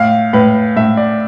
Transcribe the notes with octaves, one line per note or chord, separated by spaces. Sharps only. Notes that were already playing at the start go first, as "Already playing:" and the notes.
Already playing: A2 F5
A2 B4
A2 E5
D5